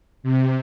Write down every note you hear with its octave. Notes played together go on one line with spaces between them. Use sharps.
C3